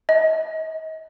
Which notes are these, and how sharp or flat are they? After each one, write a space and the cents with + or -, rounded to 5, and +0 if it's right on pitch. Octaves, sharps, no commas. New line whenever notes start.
D#5 +40